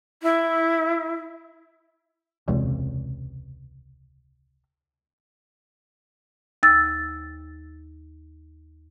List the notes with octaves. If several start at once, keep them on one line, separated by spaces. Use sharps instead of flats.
E4
E1 C#2 C3
D#2 E6 A6